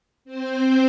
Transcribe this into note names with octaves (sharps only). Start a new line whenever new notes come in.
C4 C5